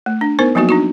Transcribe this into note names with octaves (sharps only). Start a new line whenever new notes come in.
A3
D4
B3 D#4 A#4 C5
F3 F#3 A#3 B3 D#4 F#4
D4 D#4 F#4